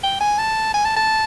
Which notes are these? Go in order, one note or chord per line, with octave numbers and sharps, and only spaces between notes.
G5
G#5
A5
G#5
A5
A5